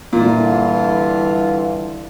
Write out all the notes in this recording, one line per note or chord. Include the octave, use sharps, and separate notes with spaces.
G2 A#2 D3 E3 F4